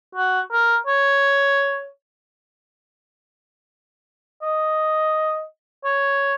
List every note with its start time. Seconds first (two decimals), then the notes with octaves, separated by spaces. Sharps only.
0.15 F#4
0.51 A#4
0.87 C#5
4.42 D#5
5.84 C#5